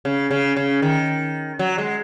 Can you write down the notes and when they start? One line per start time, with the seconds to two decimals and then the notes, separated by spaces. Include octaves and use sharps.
0.05 C#3
0.31 C#3
0.57 C#3
0.82 D#3
1.59 F#3
1.78 G#3